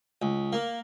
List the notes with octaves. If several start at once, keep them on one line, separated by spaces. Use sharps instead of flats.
C#2
A#3